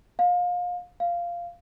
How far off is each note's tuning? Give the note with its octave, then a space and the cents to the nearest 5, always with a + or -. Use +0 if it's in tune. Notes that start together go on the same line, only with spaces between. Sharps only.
F5 +30
F5 -10